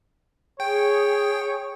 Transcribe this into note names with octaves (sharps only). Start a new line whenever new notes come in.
G#4 C#5 G5